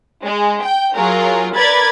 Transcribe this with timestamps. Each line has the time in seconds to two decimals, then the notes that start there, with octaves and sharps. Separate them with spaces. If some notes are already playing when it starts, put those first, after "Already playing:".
0.23 G#3
0.63 G5
0.95 F#3 F4 G#4 A#4
1.56 A#4 B4 D5 B5 G#6 A6